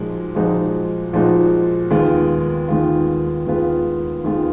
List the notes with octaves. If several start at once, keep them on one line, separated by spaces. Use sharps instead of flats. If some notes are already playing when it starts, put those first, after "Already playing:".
Already playing: A#2 F3 G#3 D#4 F#4
A#2 F3 G#3 D#4 F#4
A#2 F3 G#3 D#4 F#4
D#2 D#3 G#3 B3 F4
D#2 D#3 G#3 B3 F4
D#2 D#3 G#3 B3 F4
D#2 D#3 G#3 B3 F4